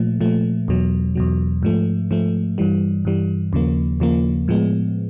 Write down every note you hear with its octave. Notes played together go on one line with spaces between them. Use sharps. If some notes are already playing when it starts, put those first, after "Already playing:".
Already playing: A#2 F3 A3
A#2 F3 A3
E2 B2 F#3
E2 B2 F#3
G#2 F3 A3
G#2 F3 A3
G2 E3 G3
G2 E3 G3
D#2 C#3 F3 A#3
D#2 C#3 F3 A#3
A2 F3 G#3 B3